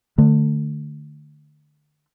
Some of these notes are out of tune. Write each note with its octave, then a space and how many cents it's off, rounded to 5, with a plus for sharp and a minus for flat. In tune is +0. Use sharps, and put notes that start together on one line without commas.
D3 +25 A3 +0